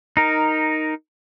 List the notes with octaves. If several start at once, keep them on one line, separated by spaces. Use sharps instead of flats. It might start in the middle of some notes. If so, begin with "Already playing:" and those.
D#4 A#4